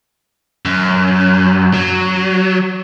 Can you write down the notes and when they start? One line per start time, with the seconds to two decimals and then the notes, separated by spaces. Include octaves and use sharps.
0.65 F#2
1.74 F#3